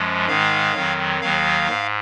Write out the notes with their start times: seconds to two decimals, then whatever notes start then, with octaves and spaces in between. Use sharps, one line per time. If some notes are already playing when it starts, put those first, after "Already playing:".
Already playing: F#2 F3 G#3
0.27 G#2 D#3 G#3 F5
0.74 F2 D#3 F#3
1.21 D#2 D#3 F#3 F5
1.68 G#2